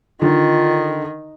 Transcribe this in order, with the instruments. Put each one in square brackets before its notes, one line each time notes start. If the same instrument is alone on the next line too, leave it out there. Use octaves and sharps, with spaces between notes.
[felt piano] D3 D#4 [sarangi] D#3 [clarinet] F4